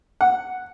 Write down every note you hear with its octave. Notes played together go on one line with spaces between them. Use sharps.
F#5